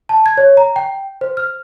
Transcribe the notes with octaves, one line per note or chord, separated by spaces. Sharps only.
A5
G#6
C#5
A#5
G5
C5
F6